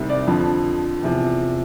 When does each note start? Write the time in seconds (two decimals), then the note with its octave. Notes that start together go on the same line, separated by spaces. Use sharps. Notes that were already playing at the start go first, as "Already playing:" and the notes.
Already playing: C2 C3 D#3 G3
0.10 D5
0.27 F2 D3 F3
1.03 E2 C3 F3